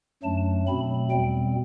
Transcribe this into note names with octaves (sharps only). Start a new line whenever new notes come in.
F#2 F#3 A3 D4 A5
B2 F#3 A3 C4 B5
E2 B2 G3 C4 G5